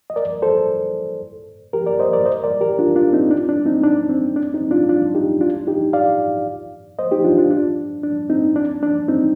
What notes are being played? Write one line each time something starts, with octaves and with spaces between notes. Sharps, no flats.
D#5
A#4 D5
A4 C5
G4 A#4
A#4 D5
C5 D#5
A#4 D5
C5 D#5
A#4 D5
G4 A#4
D4 F4
D4 F4
C4 D#4
D4
D4
C4 D#4
D4
C4
D4
C4 D#4
D4 F4
D4 F4
D#4 G4
D4 F4
D#4 G4
D5 F5
C5 D#5
D#4 G4
D4 F4
D4 F4
D4
D4
C4 D#4
D4
D4
C4 D#4